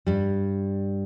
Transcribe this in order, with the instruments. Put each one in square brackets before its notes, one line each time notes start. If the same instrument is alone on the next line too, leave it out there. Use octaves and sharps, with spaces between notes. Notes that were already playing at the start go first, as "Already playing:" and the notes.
[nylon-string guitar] G2 G3